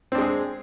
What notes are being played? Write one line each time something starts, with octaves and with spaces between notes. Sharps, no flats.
G#3 C4 D4 G#4